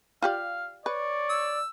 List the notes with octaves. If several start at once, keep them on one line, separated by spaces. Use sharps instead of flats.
F4 G4 D5 F5
B4 C#5 D5
E6